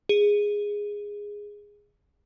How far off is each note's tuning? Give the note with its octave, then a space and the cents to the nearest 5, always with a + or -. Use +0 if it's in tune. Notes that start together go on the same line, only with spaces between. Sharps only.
G#4 -10